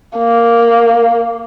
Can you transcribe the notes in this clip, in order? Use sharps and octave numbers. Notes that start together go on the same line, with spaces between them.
A#3